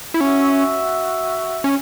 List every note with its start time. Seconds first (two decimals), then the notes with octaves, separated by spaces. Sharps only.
0.14 E4
0.21 C#4 F#4 E5
1.64 C#4